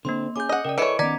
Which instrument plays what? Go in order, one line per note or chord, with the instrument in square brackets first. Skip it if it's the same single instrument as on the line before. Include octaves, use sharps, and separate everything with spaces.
[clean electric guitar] D3 C4 D4 [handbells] A#3 C6
[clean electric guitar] C#4 G#4 [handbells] D6 G6
[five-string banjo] D#5 F#5
[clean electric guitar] C#3 G5 [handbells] A#4 D5
[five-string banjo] E3 C#5 [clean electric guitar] A4 E5 [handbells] D#5 C#7 D7
[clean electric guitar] D#3 B3 C#4 [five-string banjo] D5 [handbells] A#5 G#6 B6